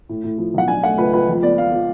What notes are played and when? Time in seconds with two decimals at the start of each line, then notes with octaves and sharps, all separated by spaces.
0.09 A2
0.24 A2
0.38 F3
0.54 B1 F#5
0.68 D4 G#5
0.83 A3 F#5
0.98 C#2 B4
1.13 C#2 B4
1.28 F2
1.42 B3 D5
1.58 F3 F5
1.72 F3